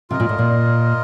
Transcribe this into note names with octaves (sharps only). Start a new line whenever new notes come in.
C3 F4 A#4 D#5
A#2
A2
A#2